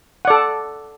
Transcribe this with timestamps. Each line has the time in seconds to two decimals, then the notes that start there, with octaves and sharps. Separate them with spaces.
0.25 F#5
0.27 D5
0.30 A4